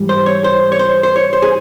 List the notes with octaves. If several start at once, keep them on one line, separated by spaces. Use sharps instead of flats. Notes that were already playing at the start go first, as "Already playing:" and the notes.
Already playing: G#2 E3 G3
C5
C#5
C5
C#5
C5
C5
C#5
C5
G#4